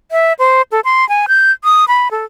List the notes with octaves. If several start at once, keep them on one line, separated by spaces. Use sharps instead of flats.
E5
C5
A4
C6
G#5
G6
D#6
B5
A4